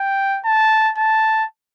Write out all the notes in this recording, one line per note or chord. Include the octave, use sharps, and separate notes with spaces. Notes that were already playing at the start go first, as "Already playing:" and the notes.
Already playing: G5
A5
A5